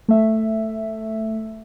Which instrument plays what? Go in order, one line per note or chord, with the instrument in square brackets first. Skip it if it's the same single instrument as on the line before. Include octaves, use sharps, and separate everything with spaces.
[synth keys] A3 E5